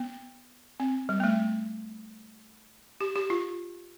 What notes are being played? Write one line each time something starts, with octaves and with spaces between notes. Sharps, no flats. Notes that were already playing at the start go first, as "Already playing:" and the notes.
Already playing: B3
C4
G3
B3
A3
G4
G4
F4